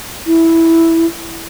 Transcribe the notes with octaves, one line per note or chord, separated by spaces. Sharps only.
E4